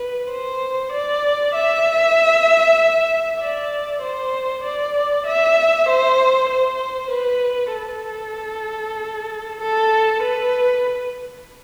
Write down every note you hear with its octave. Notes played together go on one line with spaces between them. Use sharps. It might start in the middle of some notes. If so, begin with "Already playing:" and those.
Already playing: B4
C5
D5
E5
D5
C5
D5
E5
C5
C5
B4
A4
A4
B4